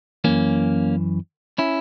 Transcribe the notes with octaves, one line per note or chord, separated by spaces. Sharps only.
F#2 E3 A#3 C#4
C#4 E4